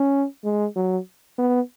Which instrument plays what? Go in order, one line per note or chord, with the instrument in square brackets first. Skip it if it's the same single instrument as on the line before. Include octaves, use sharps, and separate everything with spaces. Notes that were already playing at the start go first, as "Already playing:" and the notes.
Already playing: [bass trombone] C#4
G#3
F#3
B3